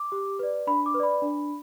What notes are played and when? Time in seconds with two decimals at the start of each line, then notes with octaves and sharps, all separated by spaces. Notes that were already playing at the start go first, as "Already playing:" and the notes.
Already playing: D6
0.12 G4
0.39 B4 D5
0.67 D4 B5
0.86 D6
0.94 B4
0.99 D5 B5
1.22 D4